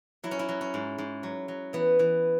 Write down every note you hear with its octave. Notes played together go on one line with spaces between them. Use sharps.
F#3 E4
C#4
E4
F#3
C#4
G#2
G#2
F#3
F#3
E3 B3
E3